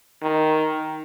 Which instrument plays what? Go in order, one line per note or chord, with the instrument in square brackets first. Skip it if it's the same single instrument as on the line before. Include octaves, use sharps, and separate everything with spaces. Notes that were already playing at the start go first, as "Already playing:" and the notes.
[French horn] D#3